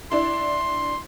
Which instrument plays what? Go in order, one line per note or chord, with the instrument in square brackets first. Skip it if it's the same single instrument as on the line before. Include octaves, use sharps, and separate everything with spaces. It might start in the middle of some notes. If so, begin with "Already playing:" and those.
[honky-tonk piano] D4 E4 [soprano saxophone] C6